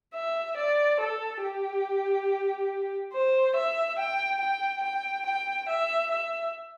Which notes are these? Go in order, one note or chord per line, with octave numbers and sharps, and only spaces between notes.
E5
D5
A4
G4
C5
E5
G5
G5
G5
G5
E5
E5